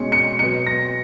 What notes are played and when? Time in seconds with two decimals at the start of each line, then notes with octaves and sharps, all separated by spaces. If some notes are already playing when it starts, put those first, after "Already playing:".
Already playing: B2 G#3 C#4 C#7
0.12 C#7
0.39 B2 F#3 B3 C#7
0.67 A#6